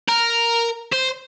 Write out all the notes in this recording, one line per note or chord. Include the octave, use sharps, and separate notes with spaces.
A#4
C5